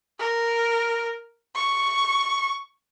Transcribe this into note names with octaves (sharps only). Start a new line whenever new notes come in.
A#4
C#6